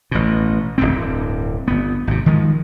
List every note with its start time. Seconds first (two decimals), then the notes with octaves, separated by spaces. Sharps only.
0.11 A1 B2
0.78 D1 G1 G2 C4
1.68 G1 B3
2.07 G#1 C3
2.26 D#3 F3 G#3